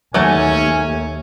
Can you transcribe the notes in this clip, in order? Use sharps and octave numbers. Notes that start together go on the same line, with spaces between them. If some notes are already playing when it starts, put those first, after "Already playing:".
D#2 F#3 A3 C#4 G#5